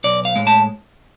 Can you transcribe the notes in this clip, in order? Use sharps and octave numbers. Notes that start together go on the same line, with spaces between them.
B1 D5
F5
A2 G#3
A5